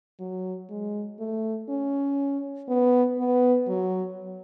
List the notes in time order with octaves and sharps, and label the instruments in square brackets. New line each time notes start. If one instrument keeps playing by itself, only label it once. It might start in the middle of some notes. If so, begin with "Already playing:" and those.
[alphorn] F#3
G#3
A3
C#4
B3
B3
F#3